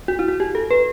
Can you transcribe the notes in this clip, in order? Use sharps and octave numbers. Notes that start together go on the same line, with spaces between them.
F#4
E4
F#4
G4
A4
B4